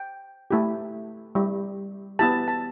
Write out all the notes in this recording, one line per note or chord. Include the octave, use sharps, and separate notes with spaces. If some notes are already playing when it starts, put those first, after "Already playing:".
Already playing: G5
A3 E4 G4
G3 E4 G4
B3 E4 G4 A5
A5